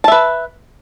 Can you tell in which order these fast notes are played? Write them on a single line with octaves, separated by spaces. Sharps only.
A5 E5 B4